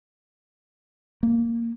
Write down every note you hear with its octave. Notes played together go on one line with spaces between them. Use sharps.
A#3